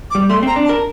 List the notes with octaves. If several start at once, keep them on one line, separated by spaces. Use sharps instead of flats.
D6
G3
A3 C6
C4 A#5
D4
A5
A#4